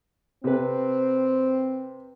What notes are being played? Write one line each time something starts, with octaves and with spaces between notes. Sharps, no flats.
C3 C4 B4